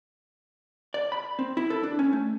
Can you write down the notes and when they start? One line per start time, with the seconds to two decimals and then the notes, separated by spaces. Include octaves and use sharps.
0.94 D5
1.12 B5
1.39 C4
1.57 E4
1.70 A4
1.83 D4
1.99 C#4
2.13 A3